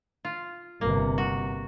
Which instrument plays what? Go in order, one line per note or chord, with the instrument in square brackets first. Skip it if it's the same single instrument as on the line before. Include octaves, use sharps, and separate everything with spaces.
[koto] F4
[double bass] G1 C3 [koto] A#3
[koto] F#4